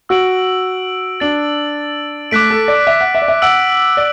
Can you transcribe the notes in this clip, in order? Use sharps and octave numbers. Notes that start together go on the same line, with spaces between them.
F#4 E6 D7 F#7
D4 A6 D7 F#7
A3 D6 F#6 B6 D7
A4
D5
E5
F#5
E5
D5
E5
F#5 E6 D7 F#7
D5